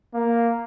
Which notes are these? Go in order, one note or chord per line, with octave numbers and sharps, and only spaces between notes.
A#3